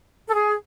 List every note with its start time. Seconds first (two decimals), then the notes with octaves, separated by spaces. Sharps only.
0.28 A4
0.33 G#4